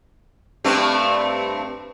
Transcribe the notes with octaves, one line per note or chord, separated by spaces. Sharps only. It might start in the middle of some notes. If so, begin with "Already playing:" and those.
G2 A3 C4